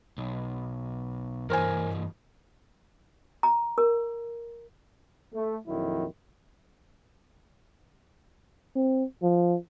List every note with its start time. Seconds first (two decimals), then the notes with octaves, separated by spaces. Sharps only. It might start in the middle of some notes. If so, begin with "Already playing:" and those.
0.18 B1
1.50 G2 E3 A#4 C5 G#5
3.43 A#5
3.78 A#4
5.34 A3
5.67 A#1 F2 D#3 F#3 E4
8.75 C4
9.22 F3